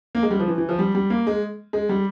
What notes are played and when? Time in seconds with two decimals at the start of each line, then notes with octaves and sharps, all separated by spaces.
0.15 A#3
0.23 G#3
0.31 G3
0.40 F3
0.48 E3
0.58 E3
0.69 F3
0.79 G3
0.95 G3
1.10 A#3
1.27 G#3
1.73 G#3
1.89 G3